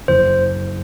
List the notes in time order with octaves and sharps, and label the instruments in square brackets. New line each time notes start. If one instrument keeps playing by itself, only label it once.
[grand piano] F#1 [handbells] C5